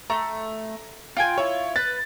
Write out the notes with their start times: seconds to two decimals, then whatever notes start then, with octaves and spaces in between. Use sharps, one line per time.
0.10 A3 A#5
1.17 F4 G5 G#5
1.38 E4 F4 C#5
1.76 B4 A6